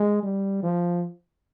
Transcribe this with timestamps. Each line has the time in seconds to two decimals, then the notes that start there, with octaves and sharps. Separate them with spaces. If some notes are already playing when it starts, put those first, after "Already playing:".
Already playing: G#3
0.23 G3
0.63 F3